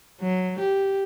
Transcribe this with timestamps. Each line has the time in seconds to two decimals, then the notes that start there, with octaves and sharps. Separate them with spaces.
0.21 F#3
0.60 G4